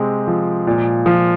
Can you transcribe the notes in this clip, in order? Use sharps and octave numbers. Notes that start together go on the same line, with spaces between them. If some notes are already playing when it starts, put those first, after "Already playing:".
Already playing: C3 G#3 C4
F3
A#2
F3